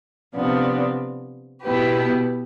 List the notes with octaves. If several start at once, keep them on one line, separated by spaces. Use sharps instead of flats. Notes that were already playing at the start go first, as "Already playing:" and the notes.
C3 F3 B3 D4
B2 B3 E4 G4 B4